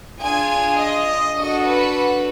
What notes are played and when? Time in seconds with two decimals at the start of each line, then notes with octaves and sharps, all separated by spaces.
0.20 D4 F4 G#4 G#5
0.78 D#5
1.36 D4 F#4 A4 D#5
1.66 B4